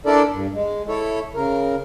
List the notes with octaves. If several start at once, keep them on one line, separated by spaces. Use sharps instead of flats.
D4 E4 A4 A#4 D5
G2
G#3
E4 A4 C#5
C#3 A#4